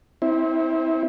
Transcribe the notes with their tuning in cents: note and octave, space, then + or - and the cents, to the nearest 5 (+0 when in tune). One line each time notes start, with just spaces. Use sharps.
C4 +15 E4 -25